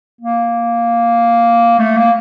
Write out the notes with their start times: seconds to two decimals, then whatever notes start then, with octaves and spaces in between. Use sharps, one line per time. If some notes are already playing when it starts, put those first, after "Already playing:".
0.21 A#3
1.79 A3
1.97 A#3